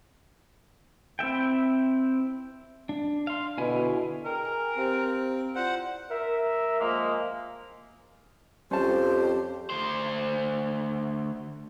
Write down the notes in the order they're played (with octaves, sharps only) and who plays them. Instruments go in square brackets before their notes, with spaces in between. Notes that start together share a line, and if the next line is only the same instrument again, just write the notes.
[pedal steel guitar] C4 E4 E5 G5
D4
F5 C6
[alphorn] B2 [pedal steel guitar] D3 E4 G#5
[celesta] G#4 G5 [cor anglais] A#4
[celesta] G#4 G#5
[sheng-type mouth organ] C4 [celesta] G4 C5 F5
[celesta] E4 F4 D5 [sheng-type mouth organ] C5 F#5
[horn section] A#4 E5
F3 G#3 A#3
[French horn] F2 [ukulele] C#4 A5 [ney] G4 [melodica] C5
[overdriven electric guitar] D2 C5